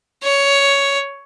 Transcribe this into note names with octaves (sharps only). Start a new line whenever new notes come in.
C#5